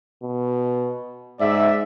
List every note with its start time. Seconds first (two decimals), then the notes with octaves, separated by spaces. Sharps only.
0.23 B2
1.40 G#2 D5 E5